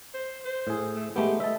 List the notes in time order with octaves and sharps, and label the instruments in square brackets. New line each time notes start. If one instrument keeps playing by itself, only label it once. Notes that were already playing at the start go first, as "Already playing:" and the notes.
[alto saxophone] C5
C5
[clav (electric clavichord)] A2 G#4
[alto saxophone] A3
[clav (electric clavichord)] G#3 A3 B3 [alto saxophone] G4
[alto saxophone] D#5 [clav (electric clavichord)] E5 A5